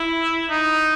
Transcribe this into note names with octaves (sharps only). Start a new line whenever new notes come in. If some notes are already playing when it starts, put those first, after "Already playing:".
Already playing: E4
D#4